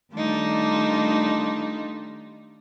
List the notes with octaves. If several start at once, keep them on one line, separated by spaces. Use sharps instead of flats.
D#3 G3 A3 D4 D#4 F4